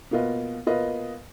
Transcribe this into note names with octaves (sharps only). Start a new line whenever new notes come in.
B2 A#3 F4 B4 D#5
B2 A#3 F4 B4 D#5